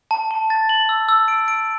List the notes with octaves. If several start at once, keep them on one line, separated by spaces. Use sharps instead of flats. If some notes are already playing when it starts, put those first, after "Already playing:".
A5
A5
A6
F#7
E6
E6
D7
D7